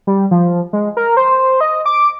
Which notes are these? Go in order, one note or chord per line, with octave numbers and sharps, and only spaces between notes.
G3
F3
G#3
A#4
C5
D#5
D6